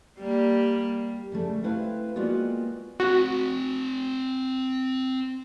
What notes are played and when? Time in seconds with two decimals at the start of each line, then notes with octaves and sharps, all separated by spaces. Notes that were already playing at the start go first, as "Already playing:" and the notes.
0.19 G3 A#3
1.32 C#3 G3 A3 A4
1.63 A3 C4 E4 B4 C5 F5
2.16 G3 G#3 A#3 B3 F4 F#4
3.00 C4 F#4 F#5